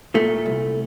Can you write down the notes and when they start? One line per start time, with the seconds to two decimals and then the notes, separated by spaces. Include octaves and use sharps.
0.15 A#2 A3
0.46 C2